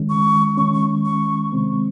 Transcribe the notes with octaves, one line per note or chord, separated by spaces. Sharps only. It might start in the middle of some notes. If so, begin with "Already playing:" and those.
Already playing: D#3 G#3 C#4
C#6
D#3 G#3 C#4 C#6
C#6
C#6
C3 D#3 G#3 C4